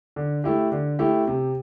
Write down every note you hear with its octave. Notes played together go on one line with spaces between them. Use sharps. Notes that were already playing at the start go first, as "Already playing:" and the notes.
D3
A3 E4 G4
D3
A3 E4 G4
C3